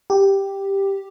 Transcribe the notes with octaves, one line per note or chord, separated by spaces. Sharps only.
G4